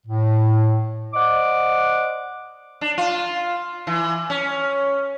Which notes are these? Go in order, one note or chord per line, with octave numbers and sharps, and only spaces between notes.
A2
C5 D5 D#5 F#5 D6
D4
F4
E3
C#4